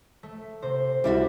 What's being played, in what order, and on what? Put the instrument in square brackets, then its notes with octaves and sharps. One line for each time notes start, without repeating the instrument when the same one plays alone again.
[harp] A3
C3 C5
[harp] C#2 [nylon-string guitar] G3 E4 F#4